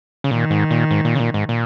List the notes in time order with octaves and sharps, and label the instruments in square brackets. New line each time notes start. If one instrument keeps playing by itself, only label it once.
[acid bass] C#3
[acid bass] A#2 [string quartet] D#3
[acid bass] G#2
A#2
G#2
A#2
C#3
A#2
G#2
A#2